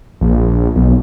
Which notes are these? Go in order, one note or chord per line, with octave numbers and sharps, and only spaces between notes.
A#1
B1